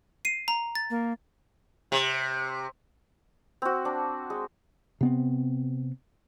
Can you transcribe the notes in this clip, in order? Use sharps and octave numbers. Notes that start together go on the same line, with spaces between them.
C7 D#7
A#5
A6
A#3
C3
C4 F#4
D4
G#3
C3 B3 C4